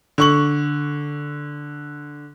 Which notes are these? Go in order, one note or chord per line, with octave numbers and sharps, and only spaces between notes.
D3 C#6 F#7